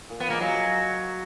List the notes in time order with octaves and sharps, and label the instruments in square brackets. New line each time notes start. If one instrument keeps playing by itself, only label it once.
[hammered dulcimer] A#2
[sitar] B3
[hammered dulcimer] F3 G#3 [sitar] A#3
[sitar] F#3